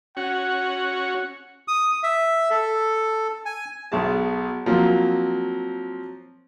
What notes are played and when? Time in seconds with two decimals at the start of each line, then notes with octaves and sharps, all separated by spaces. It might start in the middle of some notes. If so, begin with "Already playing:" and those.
0.17 C#4 F#4 F#5
1.68 D#6
2.03 E5
2.50 A4
3.46 G#5
3.92 B1 B2 G#4 A5
4.66 F3 F#3 A#3 C4